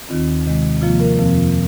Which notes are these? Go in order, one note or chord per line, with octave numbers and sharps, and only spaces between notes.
D#2 D#3 C4 F4
C3 D#3 G#3
C3 F3 A#3 F4
A#4
F2 C3 F3 C4